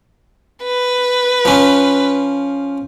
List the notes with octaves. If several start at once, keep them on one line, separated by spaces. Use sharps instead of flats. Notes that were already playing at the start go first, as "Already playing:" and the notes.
B4
F3 C#4